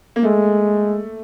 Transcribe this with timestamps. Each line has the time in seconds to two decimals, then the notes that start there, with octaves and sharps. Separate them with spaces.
0.16 A#3
0.23 G#3 A3